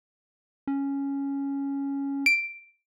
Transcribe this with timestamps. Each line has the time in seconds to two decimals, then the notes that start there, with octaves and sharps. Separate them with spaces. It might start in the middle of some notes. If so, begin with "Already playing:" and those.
0.67 C#4
2.26 D7